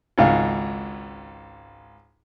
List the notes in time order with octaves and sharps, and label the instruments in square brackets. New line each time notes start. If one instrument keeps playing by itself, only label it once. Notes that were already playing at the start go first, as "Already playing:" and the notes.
[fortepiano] G#1 C#2 G#2 F5